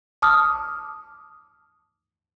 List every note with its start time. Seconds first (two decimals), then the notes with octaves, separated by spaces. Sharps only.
0.22 A5 D6 D#6 F6